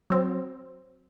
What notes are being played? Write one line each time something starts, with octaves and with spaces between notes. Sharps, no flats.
F#3 C4